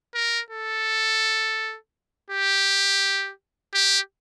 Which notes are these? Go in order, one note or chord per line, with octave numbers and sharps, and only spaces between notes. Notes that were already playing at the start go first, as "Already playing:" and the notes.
A#4
A4
G4
G4